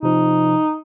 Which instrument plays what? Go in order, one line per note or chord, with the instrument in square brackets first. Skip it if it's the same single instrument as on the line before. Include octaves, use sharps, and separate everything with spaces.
[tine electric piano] C3 F3 [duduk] D#4